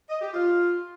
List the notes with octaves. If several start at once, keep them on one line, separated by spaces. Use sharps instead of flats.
D#5
G4
F4